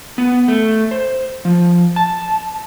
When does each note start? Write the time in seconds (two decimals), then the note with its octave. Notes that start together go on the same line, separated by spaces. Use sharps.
0.18 B3
0.48 A3
0.91 C5
1.45 F3
1.96 A5